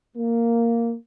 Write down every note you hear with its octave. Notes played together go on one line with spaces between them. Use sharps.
A#3